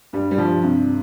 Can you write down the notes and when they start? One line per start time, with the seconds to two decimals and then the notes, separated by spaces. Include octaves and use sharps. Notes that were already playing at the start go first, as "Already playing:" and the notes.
0.13 G2 G3
0.31 G3
0.38 G2 F3
0.63 G2 C3